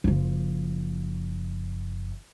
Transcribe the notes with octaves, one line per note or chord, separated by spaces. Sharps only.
F#1 F3